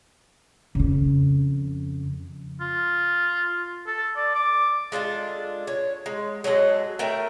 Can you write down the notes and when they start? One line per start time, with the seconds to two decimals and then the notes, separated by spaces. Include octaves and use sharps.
0.75 F2 C#3
2.61 F4
3.87 A4
4.16 D5
4.35 D6
4.92 G#3 D4 F4 A4
5.67 C#5
6.06 G#3
6.44 F#3 G#3 A4 D#5
6.99 A3 A#4 E5 G5